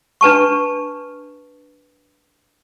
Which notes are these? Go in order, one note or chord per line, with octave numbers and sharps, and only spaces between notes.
D4 B4 A5 C#6